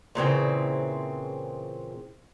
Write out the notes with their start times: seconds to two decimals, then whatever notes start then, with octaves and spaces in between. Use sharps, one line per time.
0.15 A#2 C#3 E3 C4